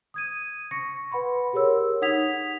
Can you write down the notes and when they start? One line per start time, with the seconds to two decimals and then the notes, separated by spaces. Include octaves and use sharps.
0.14 D#6 G#6 D#7
0.71 C#6 A#6 C#7
1.12 B4 F#5 B5 C6
1.53 G4 G#4 A#4 C#5 E6
2.02 D#4 F#5 D#6 G#6 B6 F7